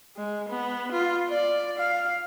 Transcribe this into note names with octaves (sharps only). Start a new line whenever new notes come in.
G#3
B3
F4
D5
F5